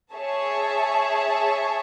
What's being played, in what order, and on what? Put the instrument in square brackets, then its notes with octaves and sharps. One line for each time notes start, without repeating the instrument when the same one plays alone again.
[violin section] G#4 C#5 E5 A5